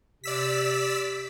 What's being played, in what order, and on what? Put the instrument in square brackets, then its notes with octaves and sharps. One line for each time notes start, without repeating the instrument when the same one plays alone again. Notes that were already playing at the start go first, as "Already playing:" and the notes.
[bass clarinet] C3 [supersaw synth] D5 E6 B6